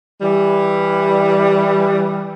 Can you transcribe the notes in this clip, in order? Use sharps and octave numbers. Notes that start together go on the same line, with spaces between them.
E3 G3